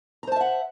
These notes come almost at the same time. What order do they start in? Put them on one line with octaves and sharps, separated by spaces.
A#5 C5 A5 E5 F#5